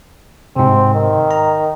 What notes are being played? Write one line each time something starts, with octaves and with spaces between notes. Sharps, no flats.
G#2 C3 C4
D#3
A#5